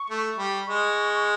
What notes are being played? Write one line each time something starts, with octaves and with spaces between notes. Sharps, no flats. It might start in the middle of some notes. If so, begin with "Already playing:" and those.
Already playing: C#6
A3
G3
G#3 C#6